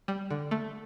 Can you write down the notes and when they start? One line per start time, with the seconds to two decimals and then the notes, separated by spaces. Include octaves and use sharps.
0.08 G3
0.31 D3
0.51 A3